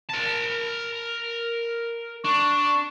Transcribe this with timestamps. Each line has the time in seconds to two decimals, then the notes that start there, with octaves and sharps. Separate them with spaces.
0.09 A#4 A5
2.25 D4 C#6